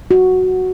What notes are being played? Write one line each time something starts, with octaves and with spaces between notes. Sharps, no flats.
F#4